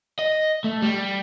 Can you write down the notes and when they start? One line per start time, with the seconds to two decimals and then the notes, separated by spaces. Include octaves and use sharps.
0.19 D#5
0.64 A3
0.82 G3